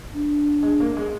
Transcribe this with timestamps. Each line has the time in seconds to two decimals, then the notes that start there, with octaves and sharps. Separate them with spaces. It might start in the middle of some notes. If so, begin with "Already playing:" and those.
0.13 D4
0.63 G#3
0.80 A#3
0.97 G#3